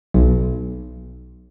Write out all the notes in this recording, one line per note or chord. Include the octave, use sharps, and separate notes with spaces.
B1